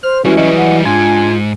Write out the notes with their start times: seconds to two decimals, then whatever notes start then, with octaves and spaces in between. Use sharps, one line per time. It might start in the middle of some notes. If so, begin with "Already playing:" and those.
0.03 C5 F6
0.25 E3 G3 G#3 C#4 F#4
0.37 F#3 G3 D#5
0.57 F#5
0.85 G#2 D4 F4 G#5